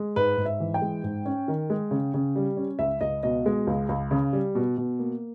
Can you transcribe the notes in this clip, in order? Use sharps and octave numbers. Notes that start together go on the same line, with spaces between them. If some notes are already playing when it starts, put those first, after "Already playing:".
Already playing: G#3
G#2 B4
G#2
E5
E3
G5
G#3
G#2
C#4
D#3
G#3
C#3
C#3
G3
C#4
C#2 E5
C#2 D#5
B2 D#5
G#3
C#2
C#2
C#3
G3
B2
B2
A#3